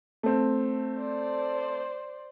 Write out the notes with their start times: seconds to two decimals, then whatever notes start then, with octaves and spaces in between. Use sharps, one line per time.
0.23 A3 C4
0.97 C5 D5